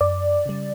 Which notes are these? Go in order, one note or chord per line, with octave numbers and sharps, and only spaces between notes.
F#2 D5
C#3 G3